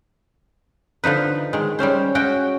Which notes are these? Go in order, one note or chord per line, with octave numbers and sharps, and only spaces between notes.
D3 F3 D#4 B4
D#3 G#3
G3 G#3 C#4 C5
G#3 C#4 F#4 G5